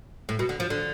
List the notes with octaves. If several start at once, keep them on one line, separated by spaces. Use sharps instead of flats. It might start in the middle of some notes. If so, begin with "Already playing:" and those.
A2
B2
D3
F3
D3